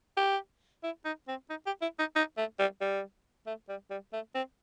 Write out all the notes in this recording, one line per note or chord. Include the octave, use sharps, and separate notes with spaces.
G4
E4
D#4
C4
D#4
G4
E4
D#4
D#4
A3
G3
G3
A3
G3
G3
A3
C4